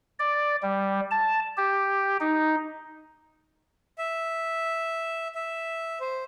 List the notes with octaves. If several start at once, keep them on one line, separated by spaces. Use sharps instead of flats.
D5
G3
A5
G4
D#4
E5
E5
C5